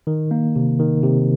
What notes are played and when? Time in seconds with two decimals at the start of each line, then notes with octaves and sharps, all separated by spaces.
0.07 D#3
0.31 A#3
0.56 C3
0.80 D#3
1.03 C3